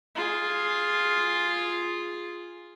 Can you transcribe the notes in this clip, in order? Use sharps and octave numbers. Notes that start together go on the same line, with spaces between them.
F4 G#4